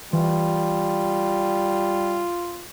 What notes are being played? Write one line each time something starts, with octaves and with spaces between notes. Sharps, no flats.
E3 G3 F4